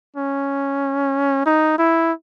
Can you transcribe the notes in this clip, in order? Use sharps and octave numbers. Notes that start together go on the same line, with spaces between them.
C#4
D#4
E4